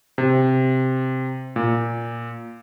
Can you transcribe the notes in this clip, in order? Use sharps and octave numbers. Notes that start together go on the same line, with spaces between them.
C3
A#2